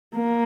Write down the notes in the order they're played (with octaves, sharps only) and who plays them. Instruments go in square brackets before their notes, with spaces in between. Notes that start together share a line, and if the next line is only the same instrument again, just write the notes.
[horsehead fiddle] A#3